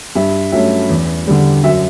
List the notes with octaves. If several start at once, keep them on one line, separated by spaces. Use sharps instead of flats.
G2 E5
F#3 A3 C#4 E5
E2
D3 G3
F#2 E5